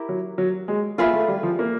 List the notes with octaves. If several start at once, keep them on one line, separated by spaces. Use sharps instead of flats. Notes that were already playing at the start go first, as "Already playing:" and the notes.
Already playing: E4 G4 A#4
F#3
F#3
G#3
A#3 F4 G#4 B4 E5
A3
G3
F3
A#3